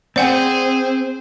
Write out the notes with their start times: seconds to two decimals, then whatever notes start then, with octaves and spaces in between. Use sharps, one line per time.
0.16 C4 G#4 C5 D5 F#5 G#5